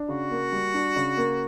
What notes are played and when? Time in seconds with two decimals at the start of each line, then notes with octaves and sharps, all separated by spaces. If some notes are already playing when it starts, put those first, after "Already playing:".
Already playing: D4
0.08 C#3 F#4
0.31 A#3
0.52 G3
0.74 D4
0.96 C#3
1.17 A#3